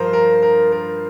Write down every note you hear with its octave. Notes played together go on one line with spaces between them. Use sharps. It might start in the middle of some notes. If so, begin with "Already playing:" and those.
Already playing: G2 F3 F4 A#4 C5
A#4
A#4
A#4